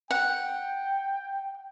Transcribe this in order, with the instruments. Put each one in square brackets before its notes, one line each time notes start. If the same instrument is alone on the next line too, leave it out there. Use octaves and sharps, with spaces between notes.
[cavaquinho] F#5 [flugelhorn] G5